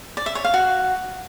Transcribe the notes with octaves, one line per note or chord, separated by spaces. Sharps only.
D5
E5
C#5
F5
F#4